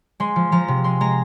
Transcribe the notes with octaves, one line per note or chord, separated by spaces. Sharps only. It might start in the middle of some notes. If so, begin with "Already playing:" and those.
G#3 C6
F3
F3 A#5
C3
G#3 C6
G#3 A#5